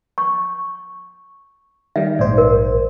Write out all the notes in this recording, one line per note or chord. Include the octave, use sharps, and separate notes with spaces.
C#6
D#3 G3 E5
A#1 G#2 C5 D5
A#4